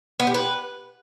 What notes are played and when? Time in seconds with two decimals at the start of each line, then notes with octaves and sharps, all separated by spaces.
0.20 B3
0.27 G4
0.34 B4